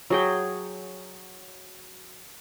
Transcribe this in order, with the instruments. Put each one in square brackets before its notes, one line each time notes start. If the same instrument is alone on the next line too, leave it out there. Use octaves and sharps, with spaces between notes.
[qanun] F#3 G#4 G5